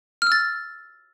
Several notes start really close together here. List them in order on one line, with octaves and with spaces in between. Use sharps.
F6 E6 A6